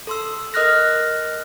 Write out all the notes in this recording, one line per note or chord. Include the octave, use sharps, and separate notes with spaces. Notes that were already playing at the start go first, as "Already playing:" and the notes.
A4 C6 E6
A#4 D#5 D#6 F6 F#6 A#6